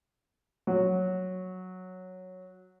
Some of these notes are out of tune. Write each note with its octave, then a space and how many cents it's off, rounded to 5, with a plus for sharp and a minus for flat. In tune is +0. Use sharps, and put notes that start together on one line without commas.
F#3 -5